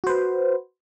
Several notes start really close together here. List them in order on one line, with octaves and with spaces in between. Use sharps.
F#4 C5 B4